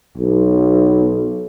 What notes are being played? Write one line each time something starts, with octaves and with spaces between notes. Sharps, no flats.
B1